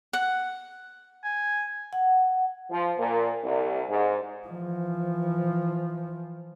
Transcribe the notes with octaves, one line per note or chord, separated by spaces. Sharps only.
F#5
G#5
F#5
F3
A#2
C2
G#2
E3 F3